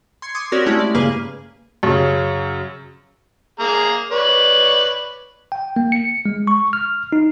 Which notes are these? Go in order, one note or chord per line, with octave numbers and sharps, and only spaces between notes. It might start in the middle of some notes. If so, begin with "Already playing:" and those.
C6 G#6 C#7
C6 D6 D#6 G#6
C4 C#4 F#4 G4 A#4 D5
G#3 A3 C#4 E4
D5
G2 C#3 A#3 G#4 B4 F6
F#2 C#3
A#3 G#4 A#5
B4 C#5 D5
G5
A#3
C#7
G#3
C#6
F6
D#4